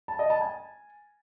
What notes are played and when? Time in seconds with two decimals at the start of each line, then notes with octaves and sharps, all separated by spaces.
0.08 A5
0.19 D#5
0.30 A5
0.41 G#5